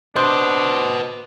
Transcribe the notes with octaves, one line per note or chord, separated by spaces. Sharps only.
D4 B4 C5 D#5 C6 G6